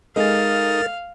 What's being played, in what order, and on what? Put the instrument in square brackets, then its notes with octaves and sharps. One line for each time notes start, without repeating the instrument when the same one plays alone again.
[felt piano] G#3 A4 D#5 [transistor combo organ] D#4 [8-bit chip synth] A#4 A6 [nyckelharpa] F5